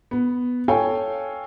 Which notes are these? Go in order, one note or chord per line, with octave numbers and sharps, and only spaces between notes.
B3
A4 C#5 F5 G5 G#5